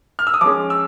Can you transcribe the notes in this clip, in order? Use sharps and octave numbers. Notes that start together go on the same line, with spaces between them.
F6
E6
D#6
F3 G#3 C#4 D6
E6